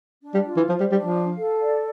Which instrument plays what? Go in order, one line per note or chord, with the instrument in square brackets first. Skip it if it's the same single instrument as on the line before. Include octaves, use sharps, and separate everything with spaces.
[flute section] D4
[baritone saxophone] G3
[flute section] F4
[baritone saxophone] E3
[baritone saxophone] F3 [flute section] C5
[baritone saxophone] G3
[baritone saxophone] G3 [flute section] D4
[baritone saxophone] F3
[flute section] F5
A4
D5